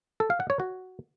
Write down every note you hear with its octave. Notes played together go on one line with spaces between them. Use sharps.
A4
F5
F#5
C#5
F#4